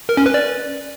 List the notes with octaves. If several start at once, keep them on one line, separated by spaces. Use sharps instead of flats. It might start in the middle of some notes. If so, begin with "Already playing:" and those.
A#4
C#4
B4
D5